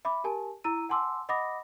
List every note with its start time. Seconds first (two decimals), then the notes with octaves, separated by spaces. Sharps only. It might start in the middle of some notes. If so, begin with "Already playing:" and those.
0.05 E5 B5 D6
0.24 G4 A#4 G#5 A5
0.64 E4 A#5 E6 D#7
0.89 F#5 G#5 A5 C6 D6 E6
1.29 D#5 F#5 B5 D6 D#6 A#6